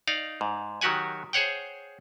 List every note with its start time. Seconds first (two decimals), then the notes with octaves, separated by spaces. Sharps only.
0.07 D#4 D5 F5
0.41 G#2
0.81 D#3 F#3 F#4 G4 F#5 G#5
1.33 G#4 C5 C#5 F#5 G5